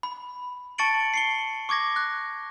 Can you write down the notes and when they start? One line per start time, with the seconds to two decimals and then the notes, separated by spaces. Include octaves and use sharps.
0.03 B5
0.78 A5 C#6 A6 C#7 D7 F#7
1.14 C7 C#7 G7
1.69 C#6 D6 G#6 A#6
1.96 F#6